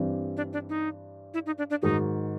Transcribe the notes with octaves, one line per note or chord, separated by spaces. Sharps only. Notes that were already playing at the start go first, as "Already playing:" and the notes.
Already playing: G2 E3 G3 C4
D4
D4
D#4
E4
D#4
D4
D4
G#2 D#3 F#3 D#4